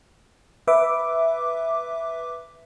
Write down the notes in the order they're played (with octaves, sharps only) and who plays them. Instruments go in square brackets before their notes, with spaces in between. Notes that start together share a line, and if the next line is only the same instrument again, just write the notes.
[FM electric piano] B4 E5 D6